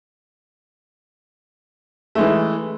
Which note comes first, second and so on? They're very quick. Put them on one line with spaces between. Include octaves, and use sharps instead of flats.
A3 G#3 E3